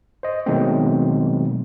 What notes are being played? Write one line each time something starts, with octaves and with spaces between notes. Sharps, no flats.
C5 D#5
B2 D#3 F#3 G#3 A3 C4